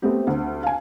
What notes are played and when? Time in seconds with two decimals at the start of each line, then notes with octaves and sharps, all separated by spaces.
0.02 A3 B3 C4 G4
0.27 D2
0.63 F5 G#5